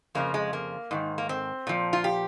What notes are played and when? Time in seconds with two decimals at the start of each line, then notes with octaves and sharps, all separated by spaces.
0.15 F2 C#3 F3 A#3
0.34 G#3
0.53 A#3
0.91 G#2 D#3
1.18 A#3
1.29 C4
1.67 A#2 F3
1.93 F4
2.04 G4